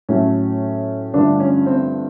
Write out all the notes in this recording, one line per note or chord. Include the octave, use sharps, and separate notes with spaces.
A2 F#3 A3 C#4
G2 D3 F3 A3 D4
C#4
C4